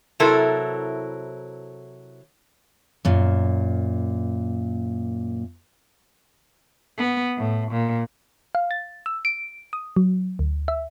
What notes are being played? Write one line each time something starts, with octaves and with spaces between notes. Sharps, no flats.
C3 F#3 E4 A4 A#4
F#2 A#2
B3
A2
A#2
F5
A6
E6
D7
D#6
F#3
D2
E5